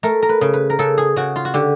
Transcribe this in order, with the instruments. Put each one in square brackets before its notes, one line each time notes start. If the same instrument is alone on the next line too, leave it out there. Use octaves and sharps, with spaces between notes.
[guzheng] A3 A#4
A#4
B4
C#3
B4
A#4
C#3 A4
G#4
C#3 F#4
F4
F#4
D3 G4